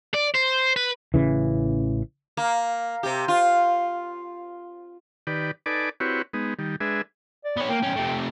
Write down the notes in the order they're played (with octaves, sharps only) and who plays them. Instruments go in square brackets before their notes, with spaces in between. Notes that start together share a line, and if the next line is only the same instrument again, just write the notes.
[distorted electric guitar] D5
C5
B4
[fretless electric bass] A1 C#3 E3
[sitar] A#3
C3 G4
F4
[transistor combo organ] D#3 G4 B4 D5
D#4 A4 B4 D5 G#5 D6
C4 E4 F#4 G4 B4 C#5
G#3 B3 D#4
D#3 G3
G#3 D4 G#4 B4 E5
[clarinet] D5
[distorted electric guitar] B3 C#5
[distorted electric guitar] A#3 [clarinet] G5
[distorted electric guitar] B1 C#4
C3 A3